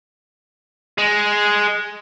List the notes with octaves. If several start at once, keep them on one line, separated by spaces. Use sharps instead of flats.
G#3